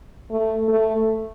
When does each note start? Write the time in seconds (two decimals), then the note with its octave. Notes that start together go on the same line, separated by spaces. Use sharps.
0.31 A3
0.68 A3